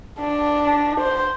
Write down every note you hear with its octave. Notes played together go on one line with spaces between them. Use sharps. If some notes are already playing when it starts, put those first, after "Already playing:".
D4
C5